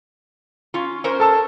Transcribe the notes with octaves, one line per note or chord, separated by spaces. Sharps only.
C#4 F4
C#4 A#4 C5
A4 A5 E6